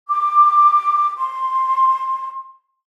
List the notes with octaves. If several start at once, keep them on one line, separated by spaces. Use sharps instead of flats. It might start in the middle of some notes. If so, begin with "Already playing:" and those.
D6
C6